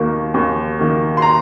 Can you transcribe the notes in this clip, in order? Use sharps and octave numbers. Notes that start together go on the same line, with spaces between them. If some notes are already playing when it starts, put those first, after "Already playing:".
Already playing: D#2 D#3 A#3
D#2
D#3 A#3
C6
A#5